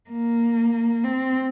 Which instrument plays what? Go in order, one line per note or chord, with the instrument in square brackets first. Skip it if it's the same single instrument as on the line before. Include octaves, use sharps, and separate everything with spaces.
[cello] A#3
C4